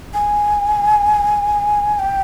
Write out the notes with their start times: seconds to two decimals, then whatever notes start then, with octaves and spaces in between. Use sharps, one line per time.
0.14 G#5
1.99 G5